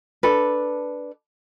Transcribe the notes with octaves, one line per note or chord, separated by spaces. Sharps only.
D4 A4 B4